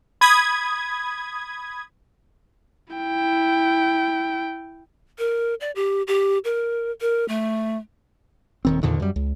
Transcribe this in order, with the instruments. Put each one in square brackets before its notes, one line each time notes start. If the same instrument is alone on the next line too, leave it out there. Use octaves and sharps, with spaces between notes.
[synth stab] B5 D#6 G#6
[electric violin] E4 G5
[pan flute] A#4
D5
G4
G4
A#4
A#4
A3
[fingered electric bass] D#1 D#3 C4
E2 A#2 D3 D#3
F#2 G3
C#2